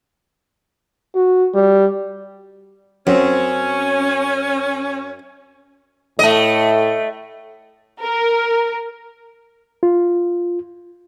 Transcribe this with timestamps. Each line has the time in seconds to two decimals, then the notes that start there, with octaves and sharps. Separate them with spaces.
1.15 F#4
1.54 G3
3.07 F#2 F#3 C4 C#4
6.19 A2 A3 D#5
8.01 A#4
9.83 F4